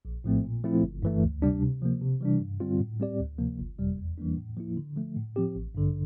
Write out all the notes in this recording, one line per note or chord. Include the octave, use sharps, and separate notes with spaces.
A#1
A2 F3 A3 C4
A#2
F3 A3 C4 E4
G1
G2 E3 A3
D2
C3 G3 D4
C3
F3 A#3
C3
E3 G3 D4
G2
D3 G3 C4 F4
A2
G3 C4 G4 D5
D2
C3 F3 A#3
G1
F2 C3 G3
E2
E3 G3 A#3 D4
A2
F3 A#3 E4
D3
F3 A3
A2
F3 C4 G4
A1
G2 D3